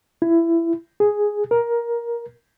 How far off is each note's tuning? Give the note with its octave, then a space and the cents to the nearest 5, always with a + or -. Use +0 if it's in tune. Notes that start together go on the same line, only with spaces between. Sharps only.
E4 +20
G#4 +0
A#4 +15